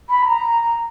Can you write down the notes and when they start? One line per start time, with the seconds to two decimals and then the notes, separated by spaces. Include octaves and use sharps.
0.10 B5
0.26 A#5